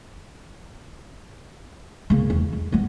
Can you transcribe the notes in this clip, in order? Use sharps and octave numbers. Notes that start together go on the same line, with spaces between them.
C#3 A#3
E2
G#3
G3 B3